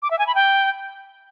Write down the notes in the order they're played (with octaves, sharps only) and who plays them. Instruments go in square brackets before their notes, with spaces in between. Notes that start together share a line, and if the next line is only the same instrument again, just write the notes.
[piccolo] D6
E5
G#5
B5
G5